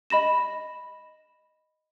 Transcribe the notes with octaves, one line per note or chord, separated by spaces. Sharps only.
D#5 B5 A#6 E7